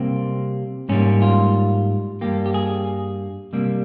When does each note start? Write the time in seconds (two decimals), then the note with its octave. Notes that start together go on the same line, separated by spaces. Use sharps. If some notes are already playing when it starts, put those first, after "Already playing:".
Already playing: C3 G3 A#3 C4
0.89 G#2 G3 A#3 C#4
1.22 F4
2.21 G2 G3 A#3 G4
2.46 G4
2.54 G#4
3.53 C3 G3 A#3